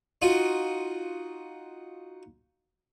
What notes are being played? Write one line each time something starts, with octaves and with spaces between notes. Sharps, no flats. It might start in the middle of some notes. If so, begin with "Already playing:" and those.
D#4 F4 F#4